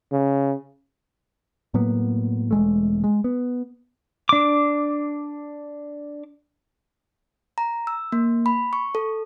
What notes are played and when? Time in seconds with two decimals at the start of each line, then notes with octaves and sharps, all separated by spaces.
0.12 C#3
1.74 A2 F#3 A#3 B3
2.51 E1 G#3 A3
3.04 G#3
3.24 B3
4.29 D4 D6
7.58 A#5
7.87 E6
8.12 A#3
8.46 B5
8.73 C#6
8.95 A4